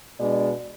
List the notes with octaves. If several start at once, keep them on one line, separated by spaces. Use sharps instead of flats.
B2 G#3 D4 D5